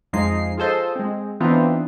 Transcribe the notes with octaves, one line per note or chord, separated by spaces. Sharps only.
F2 F3 G#3 D#4 C7
F4 G#4 A4 C5 D#5
G#3 C4
E3 B3 C4 D4 D#4 F4